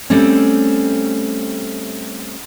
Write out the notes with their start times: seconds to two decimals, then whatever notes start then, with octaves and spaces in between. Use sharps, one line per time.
0.10 G3 A3 C4 C#4